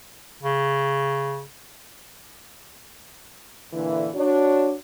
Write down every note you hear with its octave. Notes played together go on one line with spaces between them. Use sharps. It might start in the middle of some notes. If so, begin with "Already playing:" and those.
C#3
A#2 D3 E3
D4 F#4 C#5